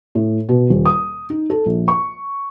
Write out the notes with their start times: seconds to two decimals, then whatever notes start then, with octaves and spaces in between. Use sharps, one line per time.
0.15 A2
0.49 B2
0.70 D#1
0.85 D#6
1.30 D#4
1.50 A4
1.66 A#1
1.88 C#6